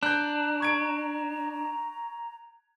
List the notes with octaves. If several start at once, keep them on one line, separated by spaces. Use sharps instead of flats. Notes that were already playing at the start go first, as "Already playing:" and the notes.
D4 A#5 F#6 G6
C#6 G#6 D7